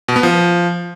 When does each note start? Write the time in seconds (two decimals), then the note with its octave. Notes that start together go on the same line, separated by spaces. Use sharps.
0.08 B2
0.16 B3
0.23 F3